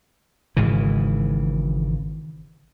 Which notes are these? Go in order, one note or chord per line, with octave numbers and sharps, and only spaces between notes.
G#1 G#2 C#3 E3